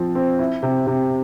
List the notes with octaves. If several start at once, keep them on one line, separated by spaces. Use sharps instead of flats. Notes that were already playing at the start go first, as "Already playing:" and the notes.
Already playing: F3 C4 F4
C4
E4
C3
C3